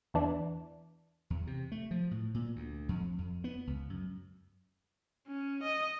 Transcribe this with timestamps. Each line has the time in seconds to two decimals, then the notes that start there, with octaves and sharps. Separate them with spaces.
0.14 E2 E3 D4
1.30 E2
1.47 C3
1.72 A3
1.91 F3
2.11 A2
2.34 A#2
2.56 D2
2.89 F2
3.19 F2
3.44 B3
3.67 C#2
3.90 F#2
5.27 C#4
5.63 D#5